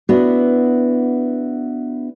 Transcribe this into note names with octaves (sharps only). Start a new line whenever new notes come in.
B3 D4 E4 F#4